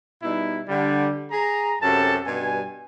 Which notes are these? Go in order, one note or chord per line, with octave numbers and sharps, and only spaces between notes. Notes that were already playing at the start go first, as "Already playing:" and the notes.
B2 G3 D#4 E4
D3 G3
G#4 A#5
F#2 C3 C#4 G4 A4 A5
G2 B2 G3 G#5